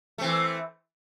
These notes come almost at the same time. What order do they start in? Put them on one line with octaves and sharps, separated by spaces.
A3 C4 E3